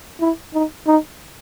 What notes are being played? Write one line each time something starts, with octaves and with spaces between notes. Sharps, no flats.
E4
D#4
D#4